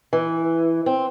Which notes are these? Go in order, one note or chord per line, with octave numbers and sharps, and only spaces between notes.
E3
C4